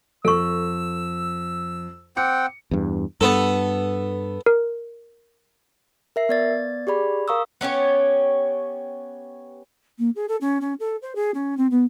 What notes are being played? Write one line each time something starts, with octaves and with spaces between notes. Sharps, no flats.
F2 A4 C#6 E6
C4 F#5 G5 D6 C#7
E2 G2
G2 B3 A4
A#4
A#4 E5 C7
B3 D5 A6
G4 G#4 D5 B5
A#4 F5 A#5 C#6 D#6 E6
B3 C#4 G4 C#5
A#3
G#4
A4
C#4
C#4
A4
C5
G#4
C#4
C4
B3